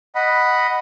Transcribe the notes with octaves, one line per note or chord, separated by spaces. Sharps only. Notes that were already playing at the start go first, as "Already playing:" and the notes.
D#5 F#5 B5